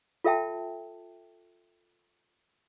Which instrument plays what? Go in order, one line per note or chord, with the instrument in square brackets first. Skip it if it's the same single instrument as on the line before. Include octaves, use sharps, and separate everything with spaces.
[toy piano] F4 A4 E5 G5 A5